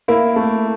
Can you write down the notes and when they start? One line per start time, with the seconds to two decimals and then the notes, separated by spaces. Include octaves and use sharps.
0.08 A#3 E4
0.36 A3